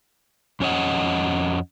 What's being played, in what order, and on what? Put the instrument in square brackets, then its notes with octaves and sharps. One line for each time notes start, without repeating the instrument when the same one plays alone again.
[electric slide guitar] F2 C#4 C#5 D#5 F#5